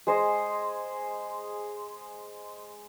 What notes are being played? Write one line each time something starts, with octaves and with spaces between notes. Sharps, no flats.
G#3 C5 D#5